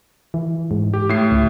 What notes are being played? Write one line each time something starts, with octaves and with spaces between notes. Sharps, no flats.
E3
G#2
G4
A2 C7
C#2